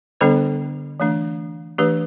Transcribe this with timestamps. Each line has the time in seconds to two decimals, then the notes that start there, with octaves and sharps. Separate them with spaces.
0.21 D3 G3 B3 D4 A4 C5
1.00 E3 A3 D4
1.78 E3 A3 D4 G4 B4